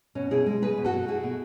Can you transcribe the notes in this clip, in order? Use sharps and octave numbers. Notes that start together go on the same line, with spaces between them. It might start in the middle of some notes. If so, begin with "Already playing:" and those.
B2 C#4
B2 E4 G#4
G#3
B2 G#4 B4
B2
F#4 A4
B2
A3 E4 G#4
B2